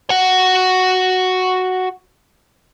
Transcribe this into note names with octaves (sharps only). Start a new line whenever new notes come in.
F#4 F#5